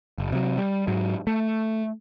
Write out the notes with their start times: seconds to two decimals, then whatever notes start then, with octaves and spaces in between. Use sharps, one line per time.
0.18 F#1
0.32 C3 F#3
0.58 G3
0.87 G#2 F#3
1.27 A3